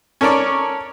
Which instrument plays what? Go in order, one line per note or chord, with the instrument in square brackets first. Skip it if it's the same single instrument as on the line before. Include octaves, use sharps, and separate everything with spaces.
[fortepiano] C#4 A4 A#4 C#5 D5